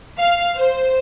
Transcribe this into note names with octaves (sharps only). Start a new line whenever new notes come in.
F5
C5